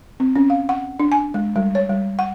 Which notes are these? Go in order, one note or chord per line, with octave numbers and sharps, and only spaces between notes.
C4
C#4
F5
F#5
D4
G#5
G#3
G3
C#5
G3
F#5